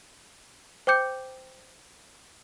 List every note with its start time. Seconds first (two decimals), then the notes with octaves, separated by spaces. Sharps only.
0.87 C5 G5 D6 G6 C#7